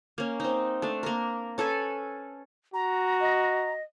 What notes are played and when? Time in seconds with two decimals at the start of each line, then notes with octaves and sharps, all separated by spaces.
0.18 A#3 C#4
0.40 C4 D#4
0.82 A3 D4
1.03 A#3 A#4
1.58 C#4 A4 B4 G#5
2.74 F#4 A#5
3.20 D#5